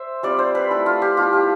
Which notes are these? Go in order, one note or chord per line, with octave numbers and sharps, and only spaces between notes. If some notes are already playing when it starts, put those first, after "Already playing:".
Already playing: C5 E5
G3 C4 F4 D5
C5
B4
A3 E4 A4
F4
G4
F3 B3 E4 F4
G4